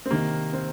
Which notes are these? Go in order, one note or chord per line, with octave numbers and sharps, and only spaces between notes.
C4
C3 D#3 A#3
C4